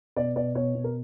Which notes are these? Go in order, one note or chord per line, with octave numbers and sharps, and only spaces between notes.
B2 D5
B2 D5
B2 C#5
B2
A#4